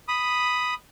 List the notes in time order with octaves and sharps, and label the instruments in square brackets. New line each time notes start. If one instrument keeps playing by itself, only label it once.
[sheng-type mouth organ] B5 D#6